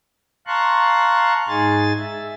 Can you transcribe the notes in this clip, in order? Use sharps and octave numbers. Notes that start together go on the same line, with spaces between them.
F5 A5 A#5 C6 C#6 F#6
G#2 D#4 G#4 G#5 A6
E5